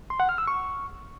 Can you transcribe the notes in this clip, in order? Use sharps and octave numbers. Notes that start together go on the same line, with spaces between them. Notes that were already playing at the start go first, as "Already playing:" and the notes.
C6
F#5
F6
E6
C#6